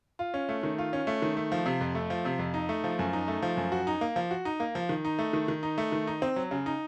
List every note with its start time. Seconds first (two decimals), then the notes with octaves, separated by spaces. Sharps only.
0.19 F4
0.34 C#4
0.49 A3
0.63 D#3
0.78 F4
0.93 C#4
1.07 A3
1.22 D#3
1.37 A3
1.52 F3
1.66 C3
1.81 F2
1.95 A3
2.10 F3
2.25 C3
2.39 F2
2.54 D#4
2.69 A3
2.84 F3
2.99 F#2
3.13 D#4
3.28 A3
3.42 F3
3.57 F#2
3.72 F#4
3.87 D#4
4.01 A#3
4.16 F3
4.31 F#4
4.45 D#4
4.60 A#3
4.75 F3
4.89 D#3
5.05 D#4
5.19 A3
5.33 D#3
5.48 D#3
5.63 D#4
5.78 A3
5.92 D#3
6.07 D#4
6.22 C4
6.36 F#3
6.51 C#3
6.66 D#4